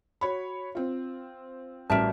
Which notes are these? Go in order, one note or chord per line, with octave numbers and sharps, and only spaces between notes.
F#4 C#5 B5
C4 F4
A1 G3 F#4 A#4 E5 A5